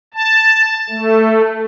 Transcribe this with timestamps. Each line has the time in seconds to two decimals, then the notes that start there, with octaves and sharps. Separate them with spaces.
0.14 A5
0.90 A3